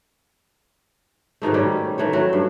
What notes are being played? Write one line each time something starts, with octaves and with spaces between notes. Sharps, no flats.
G#2 B2 D#3 A3
D#3 G3 C#4
D#3 E3 A3 C#5
F#3 A3 F#4
G2